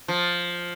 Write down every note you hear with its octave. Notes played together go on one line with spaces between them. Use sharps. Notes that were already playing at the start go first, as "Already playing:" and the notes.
F3